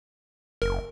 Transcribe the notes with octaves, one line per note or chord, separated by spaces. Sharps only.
F#1 A#4